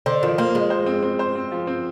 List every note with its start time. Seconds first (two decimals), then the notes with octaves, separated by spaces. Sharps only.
0.06 D3 C5
0.23 D#3 F3
0.38 A#3 C5
0.55 F3 G#3
0.70 C5
0.86 C4
1.03 C4
1.19 C5
1.35 C4
1.52 F3
1.67 C4